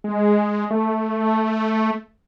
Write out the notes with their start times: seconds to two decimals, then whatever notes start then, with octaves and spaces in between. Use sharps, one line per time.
0.04 G#3
0.71 A3